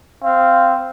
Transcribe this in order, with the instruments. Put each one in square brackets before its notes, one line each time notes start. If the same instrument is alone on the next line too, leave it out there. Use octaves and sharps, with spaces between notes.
[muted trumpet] C4 [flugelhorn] F5